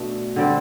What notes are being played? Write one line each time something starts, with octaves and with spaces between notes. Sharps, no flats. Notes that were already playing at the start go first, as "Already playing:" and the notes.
Already playing: B2 A3 D4
D3 G3 C4